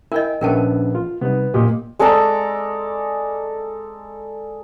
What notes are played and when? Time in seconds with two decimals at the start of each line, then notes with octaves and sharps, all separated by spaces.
0.12 E4 A#4 D#5 G5 G#5
0.41 A#1 B3 C#4 D4 A#4 E5 G5 A5
0.95 F4
1.21 C3 G3 B3 D#4
1.54 A#2 G4 D#5
1.99 G#3 A4 D5 A#5